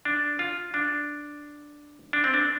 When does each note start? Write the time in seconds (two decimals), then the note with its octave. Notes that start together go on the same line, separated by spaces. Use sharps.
0.05 D4
0.39 F4
0.74 D4
2.13 D4
2.24 C4
2.34 D4